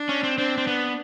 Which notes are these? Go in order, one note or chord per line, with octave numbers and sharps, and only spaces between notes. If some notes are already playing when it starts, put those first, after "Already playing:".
Already playing: D4
C#4
C4
C4 D4
C4
B3